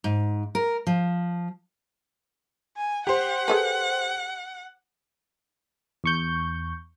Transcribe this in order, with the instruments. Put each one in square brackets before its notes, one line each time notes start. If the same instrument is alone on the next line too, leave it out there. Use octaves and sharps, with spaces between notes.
[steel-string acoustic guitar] G#2
A#4
F3
[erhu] G#5
[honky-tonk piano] G4 C5 [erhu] F#5
[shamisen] G#4 A4 B4
[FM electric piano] E2 C#6 G6